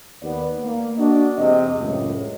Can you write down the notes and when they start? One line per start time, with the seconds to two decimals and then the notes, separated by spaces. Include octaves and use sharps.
0.23 D#2 B3 D5
0.64 A#3
0.98 D4 F#4 D#5
1.38 E2 C3 G#3 D#5
1.79 C#2 F#2 A2